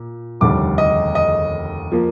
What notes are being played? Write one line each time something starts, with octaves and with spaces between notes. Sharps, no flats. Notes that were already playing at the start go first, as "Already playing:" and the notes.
Already playing: A#2
F1 D#2 D3 G3 D6
D#5
D#5
F3 A#3